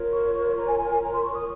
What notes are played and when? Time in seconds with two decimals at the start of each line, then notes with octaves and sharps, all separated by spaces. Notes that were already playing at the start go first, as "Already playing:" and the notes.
Already playing: F4 A#4 C#5
0.14 C#6
0.58 A#5
0.68 G#5
0.79 G#5
0.90 G#5
1.01 A#5
1.11 C6
1.23 C#6
1.33 D#6